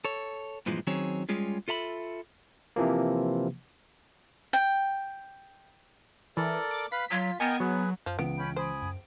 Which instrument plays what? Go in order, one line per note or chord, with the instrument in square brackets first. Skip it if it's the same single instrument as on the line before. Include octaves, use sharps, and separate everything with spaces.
[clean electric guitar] A4 C#5
G2 A#2 E3 F3 G#3
D#3 F#3 C4 C#4 G#4 C#5
G3 G#3 C#4 F4 G#4
F4 A4 E5 A#5 B5
[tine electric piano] C3 E3 F3 A#3
[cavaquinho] G5
[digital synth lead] E3 [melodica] A4 A#4 D5
[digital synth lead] D6
[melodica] B4 F5 B5 [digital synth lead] B6
[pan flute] F#3 [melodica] F4
[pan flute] B3 [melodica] A#4 D#5 G5 [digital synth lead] G#5
[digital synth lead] F#3 [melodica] G#4 B4
[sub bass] F#2 [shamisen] F3
[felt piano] C#2 D7 [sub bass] E3 [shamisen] B3
[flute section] C#4 B5 G6
[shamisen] C5 [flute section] G#5 B5 D#6
[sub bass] F#2